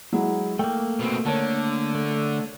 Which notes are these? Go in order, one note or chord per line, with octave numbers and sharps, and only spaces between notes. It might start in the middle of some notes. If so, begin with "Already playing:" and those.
F#3 G#3 E4
A3 A#3 G5
B2 C4
D3 A#4 C#5 A5
A3